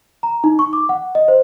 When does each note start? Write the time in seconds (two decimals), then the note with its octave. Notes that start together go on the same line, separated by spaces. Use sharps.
0.23 A#5
0.44 D#4
0.59 C#6
0.73 D6
0.89 F#5
1.15 D#5
1.28 C5